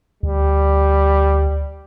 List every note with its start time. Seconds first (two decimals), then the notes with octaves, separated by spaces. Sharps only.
0.23 D2 G3